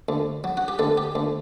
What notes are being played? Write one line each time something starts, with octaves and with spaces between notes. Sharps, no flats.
D2
F#3
F#4
G4
D2 A4
G4
D2